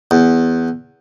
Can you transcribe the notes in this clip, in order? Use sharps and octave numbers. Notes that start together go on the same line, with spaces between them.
E2